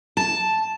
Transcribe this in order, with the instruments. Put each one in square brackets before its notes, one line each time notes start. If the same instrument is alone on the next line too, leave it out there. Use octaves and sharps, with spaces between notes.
[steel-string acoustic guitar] A5